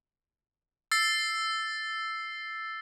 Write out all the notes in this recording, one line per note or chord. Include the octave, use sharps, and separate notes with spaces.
E6 A6 C7